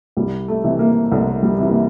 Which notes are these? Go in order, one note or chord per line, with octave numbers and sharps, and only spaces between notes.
C2 G3
A3
C3 E3
A#3
C2 A3
G3
C3 E3
A#3